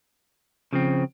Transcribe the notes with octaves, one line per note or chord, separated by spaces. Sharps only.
C#3 F3 C4